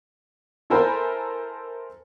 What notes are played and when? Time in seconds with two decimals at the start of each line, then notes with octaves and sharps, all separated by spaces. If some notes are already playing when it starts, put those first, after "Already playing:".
0.70 E4 A4 A#4 C5 G#5 B5